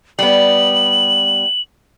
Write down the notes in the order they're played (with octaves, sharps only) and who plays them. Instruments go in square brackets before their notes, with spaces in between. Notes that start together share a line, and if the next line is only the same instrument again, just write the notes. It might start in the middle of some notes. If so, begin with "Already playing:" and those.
[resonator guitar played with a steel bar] G3 B3 [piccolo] F#7